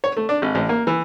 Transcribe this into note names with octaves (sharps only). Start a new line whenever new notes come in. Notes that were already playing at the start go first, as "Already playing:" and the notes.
C#5
A3
D4
G#1
A1
A#3
E3